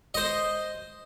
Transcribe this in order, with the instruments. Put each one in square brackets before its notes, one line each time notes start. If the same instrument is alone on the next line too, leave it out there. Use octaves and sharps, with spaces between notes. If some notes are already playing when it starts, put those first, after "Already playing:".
[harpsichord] C5 D#5